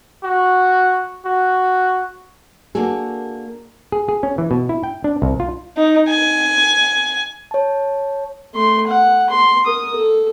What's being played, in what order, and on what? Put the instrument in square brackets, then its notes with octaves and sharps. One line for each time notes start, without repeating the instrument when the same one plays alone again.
[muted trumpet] F#4
F#4
[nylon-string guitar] A#3 D4 F#4 G#4 A4
[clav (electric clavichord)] G#4
G#4
C#4
E3
B2
E4
G5
D4
C2
F4
[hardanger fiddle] D#4
G#5
[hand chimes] C#5 A5
[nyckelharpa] A3 C6
F#5
C6
A#4 D#6
A4